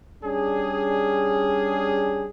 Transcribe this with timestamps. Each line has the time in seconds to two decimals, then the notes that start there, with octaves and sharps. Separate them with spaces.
0.24 G3 C#4 D4 G#4